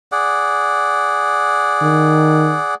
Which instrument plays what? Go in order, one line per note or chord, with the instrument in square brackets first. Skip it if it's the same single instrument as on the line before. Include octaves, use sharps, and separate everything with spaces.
[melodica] G#4 D5 F#5
[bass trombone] D#3